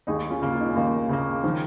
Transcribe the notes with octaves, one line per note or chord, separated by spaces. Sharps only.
D#2 D#4 G#4
C#4 F4
C#3 A#3
F4
D#4
C#4
D#2 A#3 D#4
C#3 A#3
D#3 F3